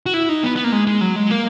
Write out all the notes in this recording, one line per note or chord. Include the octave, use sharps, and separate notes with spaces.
F#4
E4
D#4
B3
B3
A#3
G#3
G#3
F#3
G#3
A#3